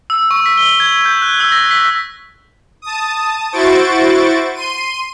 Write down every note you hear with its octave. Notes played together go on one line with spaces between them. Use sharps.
E6
C#6
B6
G7
G#6
G6
F#6
E6
A#6
B6
A5 D#6
E4 F#4 C5 C#6 A6 D7
C6 D#7